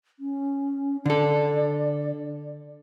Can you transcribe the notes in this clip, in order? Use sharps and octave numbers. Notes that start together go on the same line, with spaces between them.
C#4
D3 A4 D5